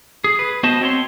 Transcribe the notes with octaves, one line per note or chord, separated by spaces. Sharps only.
G#4
B4
B3 F#4 C5 D#5 A5
C4 C#5 C6